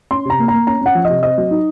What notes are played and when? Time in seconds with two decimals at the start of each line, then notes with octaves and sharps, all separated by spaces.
0.11 C#4 C6
0.25 C3 A#5
0.39 A#3
0.48 A#5
0.53 A#3
0.67 C#4 A#5
0.81 C#4 F#5
0.95 F3
1.05 D#5
1.10 C3
1.23 C4 D#5
1.38 F#3
1.51 D#4